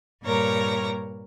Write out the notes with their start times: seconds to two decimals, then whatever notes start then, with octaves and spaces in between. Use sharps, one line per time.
0.23 G2 A#2 G3 A#4 C#5 A#5